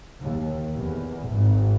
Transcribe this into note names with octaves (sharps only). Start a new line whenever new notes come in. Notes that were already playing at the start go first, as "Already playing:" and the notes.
D#2
E2
G#1